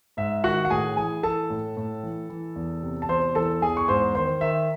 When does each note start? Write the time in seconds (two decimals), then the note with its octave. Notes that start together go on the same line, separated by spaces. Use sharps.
0.17 G#2 E5
0.44 D#3 F#4 F#5
0.65 F#5
0.70 A2 G#4 G#5
0.97 E3 G#4 G#5
1.23 E3 A4 A5
1.50 A2
1.77 A2
2.03 E3
2.30 E3
2.56 E2
2.83 C3
3.02 A5
3.09 E2 C5 C6
3.35 E3 A4 A5
3.62 E2 G#4 G#5
3.77 C#6
3.88 G#2 C5 C6
4.15 D#3 C5 C6
4.41 D#3 E5